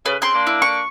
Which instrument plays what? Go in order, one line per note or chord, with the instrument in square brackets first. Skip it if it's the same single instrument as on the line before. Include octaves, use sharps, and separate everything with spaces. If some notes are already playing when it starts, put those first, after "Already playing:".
[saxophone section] C#3 [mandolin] B4
[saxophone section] C#3 C4 [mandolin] C6 F#6
[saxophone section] A#3 D4
[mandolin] E4
C#6